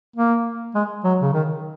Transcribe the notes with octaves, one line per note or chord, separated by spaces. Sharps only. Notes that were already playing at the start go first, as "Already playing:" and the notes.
A#3
G#3
F#3
C#3
D#3